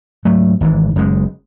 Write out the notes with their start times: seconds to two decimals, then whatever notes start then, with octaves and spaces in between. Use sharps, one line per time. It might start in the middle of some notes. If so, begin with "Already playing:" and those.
0.25 G#2 F#3 A3
0.61 G#1 G#2 E3
0.96 F#1 F#2 C#3 G#3